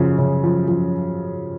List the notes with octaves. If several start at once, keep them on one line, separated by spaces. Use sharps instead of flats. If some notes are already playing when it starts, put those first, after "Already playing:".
Already playing: F#2 C#3 F3
C#3
F3
F3